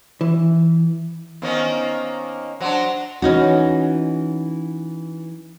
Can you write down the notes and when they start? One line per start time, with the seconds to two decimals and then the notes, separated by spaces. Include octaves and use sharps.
0.21 E3
1.42 D#3 A#3 B3 C#4 C5 D#5
2.61 F#3 D4 C5 F#5 C6
3.22 E3 C#4 D#4 F#4